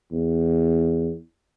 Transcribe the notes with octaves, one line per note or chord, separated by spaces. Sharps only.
E2